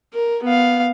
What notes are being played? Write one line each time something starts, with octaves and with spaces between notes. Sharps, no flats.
A#4
B3 F5